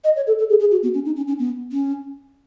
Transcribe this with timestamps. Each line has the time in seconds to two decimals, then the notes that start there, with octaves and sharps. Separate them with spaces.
0.04 D#5
0.16 C#5
0.27 A4
0.39 A4
0.49 G#4
0.60 G#4
0.71 F#4
0.83 B3
0.94 C#4
1.05 D#4
1.16 C#4
1.28 C#4
1.39 B3
1.72 C#4